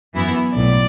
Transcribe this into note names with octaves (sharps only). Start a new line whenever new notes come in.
F#2 E3 B3 E4
B1 A2 D5